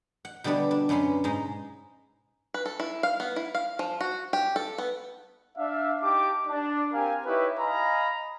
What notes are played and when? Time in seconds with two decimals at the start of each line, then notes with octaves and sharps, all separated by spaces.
0.25 F#5
0.44 B2 D3 G3 B3 D4
0.71 D4
0.89 F#2 B2 B3 C#4 C6
1.24 G#2 G#3 D#4
2.54 B4
2.66 A4
2.80 E4
3.03 F5
3.20 B3
3.36 E4
3.55 F5
3.79 F3
4.00 F#4
4.33 G4
4.56 A4
4.78 B3
5.57 D4 E5 F5
6.02 D#4 G4 A5 D6
6.47 D4
6.93 C4 G4 A#4 F5 G#5
7.26 D#4 E4 G4 B4 C#5 E5
7.59 D#5 F5 G#5 A#5 B5